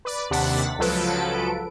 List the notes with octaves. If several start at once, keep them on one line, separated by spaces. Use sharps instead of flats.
B4 D5
D#2 C3 D4 F#5 A6 B6
C#2 F3 F#3 A4 B4 D7